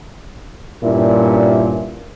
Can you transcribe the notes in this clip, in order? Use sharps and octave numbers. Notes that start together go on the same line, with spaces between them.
G2 A#2 C#4 E4